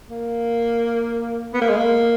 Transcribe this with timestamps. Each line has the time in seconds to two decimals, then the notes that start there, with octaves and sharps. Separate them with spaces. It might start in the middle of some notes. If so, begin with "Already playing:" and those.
0.10 A#3
1.54 B3
1.62 A#3
1.69 G#3
1.77 A#3